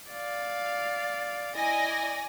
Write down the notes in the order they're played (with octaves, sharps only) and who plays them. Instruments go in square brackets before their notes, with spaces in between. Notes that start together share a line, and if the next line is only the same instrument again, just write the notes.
[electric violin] D5 F5
[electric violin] E4 D#5 [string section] D5 G#5 A#6